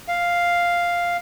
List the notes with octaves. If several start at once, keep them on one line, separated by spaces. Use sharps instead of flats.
F5